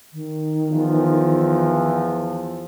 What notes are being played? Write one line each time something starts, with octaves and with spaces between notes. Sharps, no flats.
D#3
E2 F3